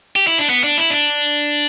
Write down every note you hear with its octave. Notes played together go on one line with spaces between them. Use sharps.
G4
E4
D4
B3
D4
E4
D4